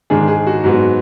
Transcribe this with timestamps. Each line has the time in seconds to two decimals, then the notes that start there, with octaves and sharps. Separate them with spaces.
0.10 G#2 D#3 G#3 D4 G#4
0.28 G#4
0.47 F#4
0.64 G#2 F#3 B3